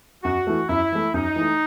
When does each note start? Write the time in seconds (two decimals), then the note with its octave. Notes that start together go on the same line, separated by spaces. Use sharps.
0.24 F#2 F#4
0.47 E3 A3
0.69 F#2 E4
0.92 E3 A3
1.14 F#2 D#4
1.36 E3
1.41 A3